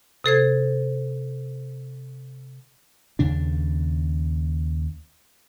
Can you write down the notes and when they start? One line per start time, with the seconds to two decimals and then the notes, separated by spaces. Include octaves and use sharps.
0.24 C3 A4 C5 G#6
3.19 D#2 C#3 D4